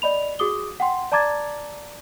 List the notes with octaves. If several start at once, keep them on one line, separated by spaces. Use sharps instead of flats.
D5 D#5 B5 F7
F#4 G#4 D6 D#6 G7
F#5 G5 C6
D5 A5 A#5 D6 G#6 A6